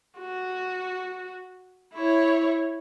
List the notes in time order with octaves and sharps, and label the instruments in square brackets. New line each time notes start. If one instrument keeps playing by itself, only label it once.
[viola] F#4
E4 C#5